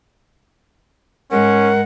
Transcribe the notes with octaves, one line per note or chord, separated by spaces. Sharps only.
G#2 G#3 C#4 A#4 F#5